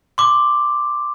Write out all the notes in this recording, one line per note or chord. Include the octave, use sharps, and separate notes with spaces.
C6 D6